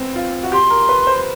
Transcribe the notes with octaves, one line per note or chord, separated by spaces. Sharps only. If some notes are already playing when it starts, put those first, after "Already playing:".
Already playing: B3 C4
F4
F#4
G4 C6
A#4
B4
C5